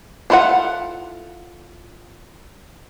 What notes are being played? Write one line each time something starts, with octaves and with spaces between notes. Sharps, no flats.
D4 E4 F4 A4 F#5